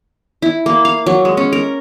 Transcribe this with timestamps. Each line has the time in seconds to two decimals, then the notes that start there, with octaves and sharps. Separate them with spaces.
0.42 E4
0.66 A#3
0.85 F5
1.06 F#3
1.25 G#3
1.37 C#4
1.53 A#4